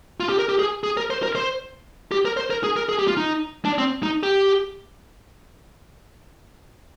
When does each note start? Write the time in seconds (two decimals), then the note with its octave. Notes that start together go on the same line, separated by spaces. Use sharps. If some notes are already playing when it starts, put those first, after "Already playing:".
0.20 F4
0.29 G4
0.39 A#4
0.49 G4
0.59 G#4
0.84 G#4
0.97 A#4
1.10 C5
1.23 A#4
1.35 C5
2.12 G4
2.25 A#4
2.37 C5
2.50 A#4
2.64 G#4
2.76 A#4
2.89 G#4
2.99 G4
3.07 F4
3.17 D#4
3.65 D4
3.78 C4
4.03 D#4
4.23 G4